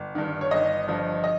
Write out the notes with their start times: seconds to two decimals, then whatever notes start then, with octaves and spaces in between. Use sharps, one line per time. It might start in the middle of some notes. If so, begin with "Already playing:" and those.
Already playing: G1
0.15 G2 D#3
0.41 C#5
0.51 G1 D#5
0.88 G2 F3
1.24 D#5